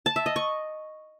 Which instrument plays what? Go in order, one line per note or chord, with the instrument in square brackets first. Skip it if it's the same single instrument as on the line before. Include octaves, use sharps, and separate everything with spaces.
[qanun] A5
E5
D#5
C#6